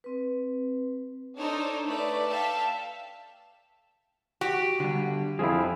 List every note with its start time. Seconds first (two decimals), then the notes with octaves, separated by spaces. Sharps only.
0.04 C4 B4
1.38 D4 D#4 A4 C5 C#5
1.86 A3 B4 D5
2.28 A4 E5 F5 G5 A5
4.41 F#4 G4
4.80 D3 G3
5.39 F2 F3 E4 G#4